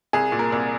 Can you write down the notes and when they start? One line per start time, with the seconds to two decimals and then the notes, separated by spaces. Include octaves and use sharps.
0.13 C2 G#4
0.32 A#2
0.39 A#4
0.52 C2